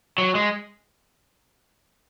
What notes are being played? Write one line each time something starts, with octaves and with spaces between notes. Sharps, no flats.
F#3
G#3